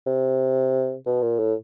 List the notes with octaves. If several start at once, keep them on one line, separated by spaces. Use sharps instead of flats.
C3
B2
A#2
A2